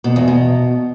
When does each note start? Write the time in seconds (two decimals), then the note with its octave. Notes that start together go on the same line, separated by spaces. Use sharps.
0.04 B2
0.16 E2
0.28 B2